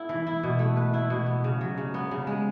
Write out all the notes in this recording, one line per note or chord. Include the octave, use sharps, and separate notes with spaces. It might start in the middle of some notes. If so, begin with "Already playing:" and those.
Already playing: B3 E4 A4
E3
E4
B2
A3
B4
E4
B2
B3
C#3
F#3
C#3
B3
C#3
G#3